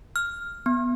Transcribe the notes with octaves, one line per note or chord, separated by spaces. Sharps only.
F6
B3